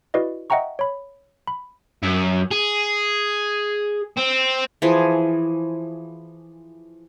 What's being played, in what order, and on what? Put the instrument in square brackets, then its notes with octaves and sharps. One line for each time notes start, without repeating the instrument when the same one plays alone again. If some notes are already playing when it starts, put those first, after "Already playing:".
[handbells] E4 F#4 B4 D5 D#5
D#5 E5 F#5 G5 A#5 C#6
C#5 B5
B5
[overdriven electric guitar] F#2
G#4
C4
[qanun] E3 F3 G#4